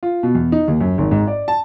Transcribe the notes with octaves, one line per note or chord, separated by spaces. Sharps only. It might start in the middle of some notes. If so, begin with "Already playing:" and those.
F4
B2
E2
D#4
D#2
F#2
G#1
G#2
D5
A5